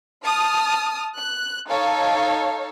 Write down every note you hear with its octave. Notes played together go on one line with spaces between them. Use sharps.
A5 D#6 F6
F#6
D#4 A4 C#5 F5